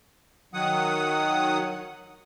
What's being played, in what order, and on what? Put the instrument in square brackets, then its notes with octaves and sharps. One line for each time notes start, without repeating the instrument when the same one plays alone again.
[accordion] D#3 F#3 F#5 D#6